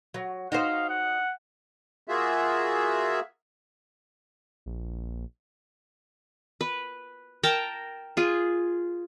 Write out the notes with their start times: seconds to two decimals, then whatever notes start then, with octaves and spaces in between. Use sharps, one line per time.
0.14 F#3
0.52 D#4 F#4 C5 F5
0.90 F#5
2.07 A#3 F4 F#4 G#4 E5
4.66 A#1
6.61 B4
7.43 A#4 G5 A5 A#5
8.17 F4 G#4